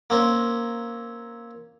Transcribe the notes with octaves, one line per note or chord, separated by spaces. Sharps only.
A#3 C4 C#4